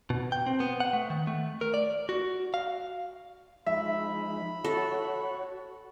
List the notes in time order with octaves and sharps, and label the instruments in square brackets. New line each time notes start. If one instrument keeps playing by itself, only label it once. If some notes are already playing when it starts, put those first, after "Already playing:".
[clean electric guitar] B2
G5
C4
B3
F#5
A3
D#3
A3
A#4
D5
F#4
F5
[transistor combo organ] F3 G#3 D#4 [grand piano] E5 [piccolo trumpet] B5
[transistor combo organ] F#4 C#5 [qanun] A4